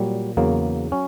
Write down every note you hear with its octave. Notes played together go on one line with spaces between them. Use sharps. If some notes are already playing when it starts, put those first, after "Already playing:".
Already playing: A#2 F#3 G3
E2 C#3 F#3 A#3
F#3 C#4